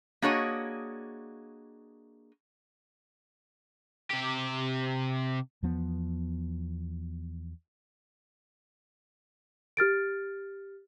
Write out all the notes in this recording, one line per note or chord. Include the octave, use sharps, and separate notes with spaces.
A#3 D4 F#4 G#4 C#5 D#5
C3 G4
E2 F3 B3
G4 F6 A6 D7